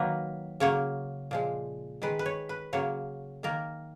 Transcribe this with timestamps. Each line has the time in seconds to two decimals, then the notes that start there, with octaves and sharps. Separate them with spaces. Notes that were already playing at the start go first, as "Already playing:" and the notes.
Already playing: D#3 F#3 A#3 B4
0.60 C#3 F#3 A#3 C#5
1.31 A#2 F3 G#3
2.02 D#3 G#3 B4
2.19 B4
2.26 C#5
2.49 B4
2.73 C#3 F#3 A#3 C#5
3.43 D#3 A#3 A#4